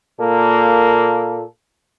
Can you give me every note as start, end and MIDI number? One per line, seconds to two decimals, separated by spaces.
0.20 1.43 46
0.20 1.43 58
0.20 1.43 69